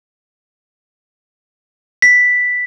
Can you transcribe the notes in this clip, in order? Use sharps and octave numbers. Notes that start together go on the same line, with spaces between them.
B6